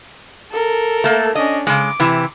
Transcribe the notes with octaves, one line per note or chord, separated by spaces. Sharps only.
A4 A#4
A3 A#3
C#4 D4 D#5
C#3 G#3 D6
C3 E3